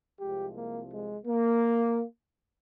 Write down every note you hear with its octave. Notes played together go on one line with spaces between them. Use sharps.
C2 C3 F3 G#3 G4
A#3
G#3
A#3